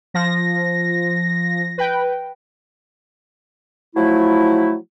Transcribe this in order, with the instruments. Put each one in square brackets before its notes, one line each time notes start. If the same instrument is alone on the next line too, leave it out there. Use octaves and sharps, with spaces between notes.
[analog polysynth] F3 A#6
B4 G5
[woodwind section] F3 F#3 A3 E4